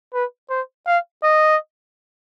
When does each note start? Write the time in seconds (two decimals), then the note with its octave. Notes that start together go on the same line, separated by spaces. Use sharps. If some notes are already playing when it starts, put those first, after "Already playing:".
0.14 B4
0.50 C5
0.87 F5
1.23 D#5